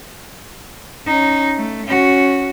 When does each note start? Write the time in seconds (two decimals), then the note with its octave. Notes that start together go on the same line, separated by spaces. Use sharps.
1.07 C#4 D#4
1.56 A3
1.87 C#4 F#4